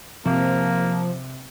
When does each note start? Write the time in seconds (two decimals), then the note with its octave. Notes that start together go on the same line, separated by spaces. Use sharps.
0.26 C3 F3 A#3